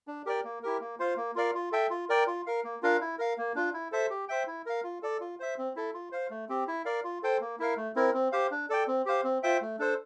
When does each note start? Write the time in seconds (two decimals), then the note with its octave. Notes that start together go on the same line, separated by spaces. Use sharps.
0.07 D4
0.26 G4 A#4 D5 G5
0.44 A#3
0.63 E4 G4 A#4
0.81 A#3
1.00 F4 C5 F5
1.17 A#3
1.35 F4 A#4 D5 F5
1.55 F4
1.72 A4 E5 G5
1.90 F4
2.09 A#4 D5 G5
2.27 F4
2.46 A#4 F5
2.64 A#3
2.82 D4 F4 A#4 F5
3.01 E4
3.19 A#4 F5
3.38 A#3
3.55 D4 F4
3.74 E4
3.92 A4 C5 E5
4.10 G4
4.28 C5 E5 G5
4.47 E4
4.66 A#4 F5
4.84 F4
5.03 A4 D5
5.21 F4
5.40 C5 E5
5.58 C4
5.76 E4 A4
5.94 F4
6.12 C5 F5
6.30 A3
6.49 C4 G4
6.68 E4
6.85 A#4 D5 F5
7.04 F4
7.23 A4 C5 G5
7.41 A#3
7.59 E4 A#4 F5
7.77 A3
7.96 C4 E4 A#4
8.14 C4
8.32 G4 C5 F5
8.51 D4
8.69 A4 D5 G5
8.87 C4
9.06 G4 C5 F5
9.24 C4
9.43 F4 C5 E5 G5
9.62 A3
9.79 D4 A4 C5